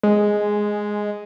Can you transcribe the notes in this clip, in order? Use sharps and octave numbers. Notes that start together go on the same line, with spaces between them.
G#3